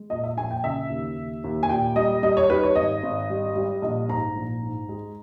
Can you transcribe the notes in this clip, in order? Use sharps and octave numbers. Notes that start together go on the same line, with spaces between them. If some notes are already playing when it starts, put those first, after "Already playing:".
Already playing: G#3
A#2 D#5
E5
A#1 G#5
G5
C#3 E5
D#2
D#2
D#2
G#5
A#2 G5
G3 D#5
G3 D#5
C#5
D#4 B4
C#5
G#1 D#5
G#1
G3
G3
A#1 D#5
G#2 A#5
A#1
G#2
G#3